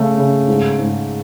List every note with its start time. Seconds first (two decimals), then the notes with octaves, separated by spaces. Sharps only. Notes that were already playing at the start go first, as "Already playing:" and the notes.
Already playing: C#3 A3
0.17 C#3
0.48 G#2
0.79 G#2